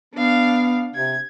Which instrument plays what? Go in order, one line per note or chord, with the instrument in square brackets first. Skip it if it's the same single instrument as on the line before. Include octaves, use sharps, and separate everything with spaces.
[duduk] B3 [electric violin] D4 F5
[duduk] C3 [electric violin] G#6